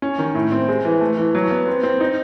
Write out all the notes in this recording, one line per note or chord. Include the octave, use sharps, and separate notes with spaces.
C#4
D#3
A2
C4
G#3
E3
A3
E3
F#3
B3
C4
C4
D#4